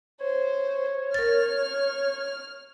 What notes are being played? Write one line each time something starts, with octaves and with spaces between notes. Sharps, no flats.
C5 C#5
A#4 F6 A6